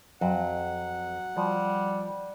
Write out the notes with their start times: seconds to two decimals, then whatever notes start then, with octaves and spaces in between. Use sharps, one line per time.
0.21 F2 F#3 F#5
1.37 F3 G3